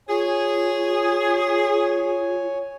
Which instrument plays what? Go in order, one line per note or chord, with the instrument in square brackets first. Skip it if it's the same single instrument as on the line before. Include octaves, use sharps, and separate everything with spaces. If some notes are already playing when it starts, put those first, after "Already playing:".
[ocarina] F4 [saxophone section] G#4 [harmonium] C#5 G#5